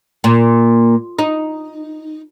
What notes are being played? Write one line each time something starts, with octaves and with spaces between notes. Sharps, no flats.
A#2
D#4